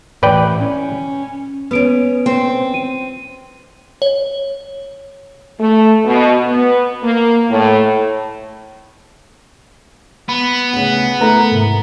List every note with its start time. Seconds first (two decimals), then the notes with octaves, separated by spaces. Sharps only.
0.23 A2 E3 B4 D5 G5
0.61 C#4
1.71 B3 C#4 B4 D7
2.26 C4
2.74 D#7
4.02 C#5
5.60 A3
6.05 B2
6.47 B3
7.03 A#3
7.51 A2
10.29 B3 B5
10.73 D2 C#3 F#5
11.21 A3 E4 A#4 B4 A#5
11.52 G#2 C3